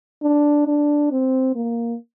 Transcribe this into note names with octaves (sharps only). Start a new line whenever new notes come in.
D4
D4
C4
A#3